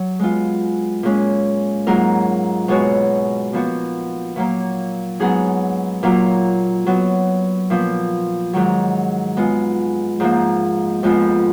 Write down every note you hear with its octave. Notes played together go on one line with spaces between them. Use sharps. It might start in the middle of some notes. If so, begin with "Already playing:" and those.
Already playing: F#3
G#3 B3 F4
A#2 G#3 C#4
G#2 F#3 A#3 F4 A#4
B2 G#3 B3 F#4 C#5
A#2 F3 B3 F#4
A#2 F#3 A#3
G#2 F#3 B3 D#4 G#4
A#2 F#3 A#3 F4
F#3 B3 F#4
A#2 F3 B3
G#2 D#3 F#3
G#3 B3 F4
G#2 F3 A#3
F2 F3 G#3 B3 F4